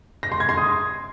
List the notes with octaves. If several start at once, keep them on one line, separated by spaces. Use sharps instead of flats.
A#6
C6
G#6
C6
D#6